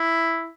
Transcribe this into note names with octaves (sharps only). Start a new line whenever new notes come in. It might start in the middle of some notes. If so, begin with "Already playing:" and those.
Already playing: E4